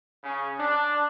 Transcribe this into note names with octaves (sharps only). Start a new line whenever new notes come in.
C#3
D4